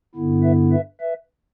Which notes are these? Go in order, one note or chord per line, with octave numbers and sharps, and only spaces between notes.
G2 D3 B3 E4
B4 E5
B4 E5
B4 E5